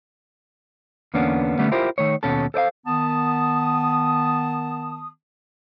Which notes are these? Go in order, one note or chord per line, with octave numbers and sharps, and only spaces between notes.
E2 D3 A#3 B3 C#4 D4
D3 G3 A3 B3 C#4
E4 F4 G4 A#4 C5
D#3 A3 C#5
D#2 B2 C#4 A4
A4 C5 D5 F5
D#3 B3 A5 D#6